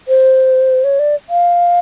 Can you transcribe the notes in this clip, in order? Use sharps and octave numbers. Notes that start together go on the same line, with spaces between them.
C5
C#5
D5
F5